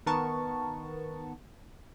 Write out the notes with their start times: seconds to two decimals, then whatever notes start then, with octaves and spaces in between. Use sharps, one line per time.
0.06 D#3 B3 A#4 A5 C#6